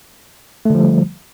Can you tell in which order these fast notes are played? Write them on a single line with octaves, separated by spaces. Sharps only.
A3 D3 F3 G3